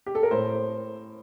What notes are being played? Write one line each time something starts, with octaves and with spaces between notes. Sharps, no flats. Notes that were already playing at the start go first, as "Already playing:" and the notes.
G4
A4
A#4
A2 C5